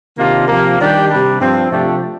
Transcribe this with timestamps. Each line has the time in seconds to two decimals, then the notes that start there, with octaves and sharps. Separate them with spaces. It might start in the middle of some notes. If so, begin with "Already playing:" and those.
0.17 C3 D#3 A#3 D4 F4
0.48 C3 F3 A#3
0.78 D#3 G3 D4 G4
1.09 C3 G3 D4
1.39 G2 F3 C4
1.69 C3 F3 A3 D4 G4